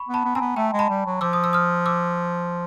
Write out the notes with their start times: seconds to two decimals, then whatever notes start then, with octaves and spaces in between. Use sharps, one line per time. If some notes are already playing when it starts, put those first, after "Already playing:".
Already playing: B5 C#6
0.09 B3
0.14 A5 B5
0.25 B3
0.35 C4 G#5 A#5
0.40 B3
0.56 A3 G5 A5
0.73 G#3
0.79 A5 B5
0.89 G3
1.06 F#3
1.21 F3 D6 E6
1.33 D#6
1.44 E6
1.53 D#6 F6
1.86 D6 E6